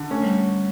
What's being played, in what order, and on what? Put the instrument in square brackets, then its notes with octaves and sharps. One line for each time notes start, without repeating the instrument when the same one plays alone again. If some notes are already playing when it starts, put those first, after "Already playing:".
Already playing: [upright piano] D3
[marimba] A3 [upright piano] C#4
[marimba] G3